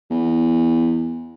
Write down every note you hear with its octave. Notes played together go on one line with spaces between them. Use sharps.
E2